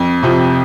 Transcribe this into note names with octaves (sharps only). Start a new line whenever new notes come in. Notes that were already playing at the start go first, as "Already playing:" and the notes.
Already playing: F2
C3 F3